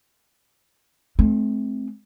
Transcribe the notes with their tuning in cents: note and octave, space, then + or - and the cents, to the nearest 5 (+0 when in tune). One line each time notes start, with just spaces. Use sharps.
A3 -40 C4 +0